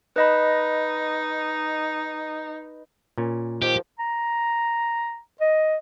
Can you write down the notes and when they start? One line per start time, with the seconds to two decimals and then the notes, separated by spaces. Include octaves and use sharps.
0.16 D#4 B4 D#5 B5
3.18 A#2 C#4
3.62 D#3 F3 G4
3.99 A#5
5.41 D#5